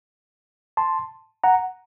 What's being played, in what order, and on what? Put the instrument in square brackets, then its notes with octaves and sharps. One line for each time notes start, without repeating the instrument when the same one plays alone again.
[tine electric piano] A5 C6
F#5 A#5